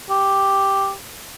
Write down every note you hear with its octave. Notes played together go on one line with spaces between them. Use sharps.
G4